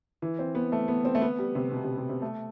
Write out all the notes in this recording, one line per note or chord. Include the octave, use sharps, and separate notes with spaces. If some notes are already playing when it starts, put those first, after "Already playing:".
E3
C4
B3
A3
B3
C4
A3
B3
G3
C3
B2
C3
C3
C3
A3